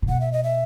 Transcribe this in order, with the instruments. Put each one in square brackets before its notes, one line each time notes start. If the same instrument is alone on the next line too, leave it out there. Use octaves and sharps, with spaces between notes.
[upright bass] A#2
[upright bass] B2 [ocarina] F#5
[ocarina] E5
D#5
E5